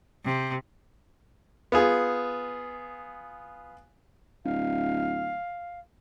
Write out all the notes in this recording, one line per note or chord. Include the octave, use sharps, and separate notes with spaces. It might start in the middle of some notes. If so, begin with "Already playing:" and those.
C3
B3 F4 G#4
D1 F5